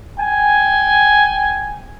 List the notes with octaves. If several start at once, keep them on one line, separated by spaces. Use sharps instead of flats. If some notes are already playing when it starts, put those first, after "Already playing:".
G5 G#5